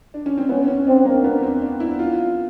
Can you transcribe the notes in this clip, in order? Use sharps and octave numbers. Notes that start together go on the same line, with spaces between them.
D4
C#4
C4
B3 C#4
C#4
C4 D4
A#3
B3
C4
D4
E4
F4